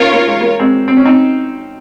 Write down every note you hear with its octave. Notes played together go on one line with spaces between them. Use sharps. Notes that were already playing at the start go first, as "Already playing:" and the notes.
Already playing: A#3 C#4 D#4 F4 A#4 C#5
A#3
G#3
A#3
G#3 C4
C4
C#4
C4 D#4